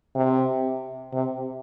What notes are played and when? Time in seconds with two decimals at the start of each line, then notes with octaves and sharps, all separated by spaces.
0.15 C3
1.13 C3